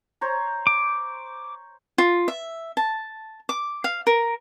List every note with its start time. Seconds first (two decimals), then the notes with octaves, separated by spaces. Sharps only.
0.21 C5 C#5 A#5
0.67 D6
1.98 F4
2.28 E5
2.77 A5
3.49 D6
3.84 F5
4.07 A#4